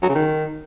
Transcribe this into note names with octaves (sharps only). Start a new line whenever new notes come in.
F#3
C#3
D#3